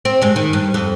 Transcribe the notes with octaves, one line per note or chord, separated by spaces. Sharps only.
C4
G2 G#3
D#3
G2
F2